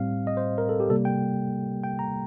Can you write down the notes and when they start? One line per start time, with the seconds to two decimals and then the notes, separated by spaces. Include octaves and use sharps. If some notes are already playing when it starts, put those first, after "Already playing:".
Already playing: A2 G3 C4 F5
0.27 D#5
0.37 C5
0.58 A#4
0.69 A4
0.80 G4
0.89 C3 G3 A#3 A4
1.05 G5
1.84 G5
1.99 A#5